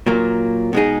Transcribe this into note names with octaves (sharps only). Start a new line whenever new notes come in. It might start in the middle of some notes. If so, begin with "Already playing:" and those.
A#2 F#3 A#3
B2 G#3 D#4 G#4